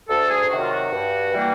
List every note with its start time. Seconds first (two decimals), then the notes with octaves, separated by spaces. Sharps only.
0.09 D2 A4
0.29 G#4
0.50 C3 D#3 F#3 F#4
0.61 F4
0.71 F#4
0.91 G2
1.32 E3 G3 A#3